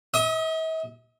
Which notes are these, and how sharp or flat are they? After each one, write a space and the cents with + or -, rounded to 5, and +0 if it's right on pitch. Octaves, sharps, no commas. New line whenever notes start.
E5 -45 D#6 +10